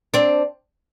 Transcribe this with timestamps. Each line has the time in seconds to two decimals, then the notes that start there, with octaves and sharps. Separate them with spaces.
0.14 C4 D4